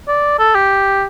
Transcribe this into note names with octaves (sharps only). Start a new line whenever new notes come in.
D5
A4
G4